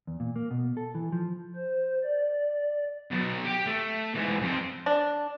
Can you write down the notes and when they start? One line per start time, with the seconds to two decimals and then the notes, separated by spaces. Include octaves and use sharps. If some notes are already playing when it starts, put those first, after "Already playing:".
0.07 E2
0.20 A#2
0.36 A#3
0.51 B2
0.77 A4
0.95 E3
1.12 F3
1.55 C5
2.04 D5
3.11 B2 F#3
3.45 G4 G5
3.66 A3
4.15 G#2 E3
4.42 F2 C4
4.86 D4